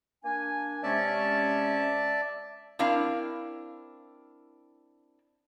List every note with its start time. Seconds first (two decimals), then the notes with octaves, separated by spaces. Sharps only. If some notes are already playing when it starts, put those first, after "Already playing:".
0.24 A#3 D4 G#5
0.83 C3 G#3 C#4 D5 E5 A5
2.79 C4 D4 E4 A#4 F5